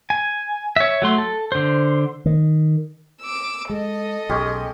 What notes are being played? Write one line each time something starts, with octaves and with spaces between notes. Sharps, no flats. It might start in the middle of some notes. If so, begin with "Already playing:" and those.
G#5
C#5 E5
F#3 A3 C6
A4
D3 C5
D#3
D6 E6
G#3 A4 D#5
B1 G#3 C#4 G4